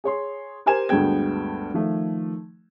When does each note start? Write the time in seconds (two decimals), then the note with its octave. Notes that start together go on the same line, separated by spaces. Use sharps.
0.04 G#4 C#5 C6
0.66 G4 A#4 C5 G#5 G#6 E7
0.89 D2 G2 G#3 B3 G5 G#6
1.74 D#3 F3 A3